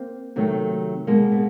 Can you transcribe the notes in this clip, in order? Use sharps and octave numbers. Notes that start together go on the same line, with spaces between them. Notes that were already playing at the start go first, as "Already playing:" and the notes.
Already playing: A#3 C4
C3 D#3 F#3 A3
B2 G#3 A#3
B3